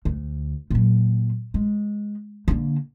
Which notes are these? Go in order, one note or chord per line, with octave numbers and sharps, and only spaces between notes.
D2
A#2 F#3
G#3
D3 A#3